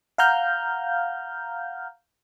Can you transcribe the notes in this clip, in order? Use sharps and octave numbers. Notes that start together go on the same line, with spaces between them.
F5 F#5 A#5 F6 G6